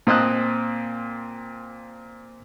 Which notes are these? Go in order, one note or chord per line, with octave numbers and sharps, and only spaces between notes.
A#2 C4 D#5 A5 F#6